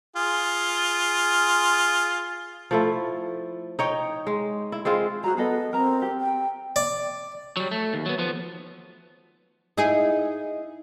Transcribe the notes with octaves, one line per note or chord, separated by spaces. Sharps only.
F4 G#4
F3 A3 E4
D#4 C#5 G5
G#3
E4
G#3 C4 F4 G#4
F#4 G#4 C5 A#5
B3 G#4 A4 D#5
C4 A#4 A#5
G4
G5
D5
F#3 G3
A3
D#2
F#3 B3
F3 B3
D#4 E4 G#4